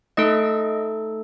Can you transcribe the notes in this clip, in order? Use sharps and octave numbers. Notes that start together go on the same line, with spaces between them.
A3 D#4 A4 D#5